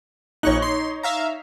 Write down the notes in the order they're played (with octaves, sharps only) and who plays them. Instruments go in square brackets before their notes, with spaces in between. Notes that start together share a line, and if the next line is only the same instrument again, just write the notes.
[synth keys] A#1 C#6 F#6 [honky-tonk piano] D#4 C#5
[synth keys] C6
E5 F5 A#5